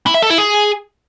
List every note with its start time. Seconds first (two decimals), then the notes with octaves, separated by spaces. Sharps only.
0.07 E4
0.14 E5
0.22 A4
0.30 E4
0.38 G#4